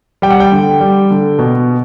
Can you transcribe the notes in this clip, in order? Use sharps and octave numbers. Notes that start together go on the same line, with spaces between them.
G3 G5
F#5
G5
D3
G3
D3
B2